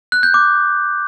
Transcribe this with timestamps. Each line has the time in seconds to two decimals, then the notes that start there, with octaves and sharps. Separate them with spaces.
0.12 F#6
0.23 G6
0.34 D6